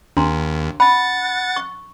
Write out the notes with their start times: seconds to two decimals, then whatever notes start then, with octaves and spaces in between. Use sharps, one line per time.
0.17 D#2 D4 A#5 C6
0.80 F#5 A5 B5 A6
1.56 C#6